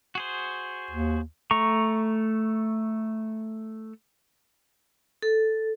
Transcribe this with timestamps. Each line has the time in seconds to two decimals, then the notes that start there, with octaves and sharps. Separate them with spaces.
0.15 F#4 G#4 C5
0.91 D#2
1.51 A3 A#5 C#6
5.22 A4